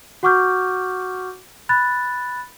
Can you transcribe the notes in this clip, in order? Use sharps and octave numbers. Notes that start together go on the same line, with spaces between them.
F#4 F#5 C#6 D6 F6 G6
B5 F#6 A6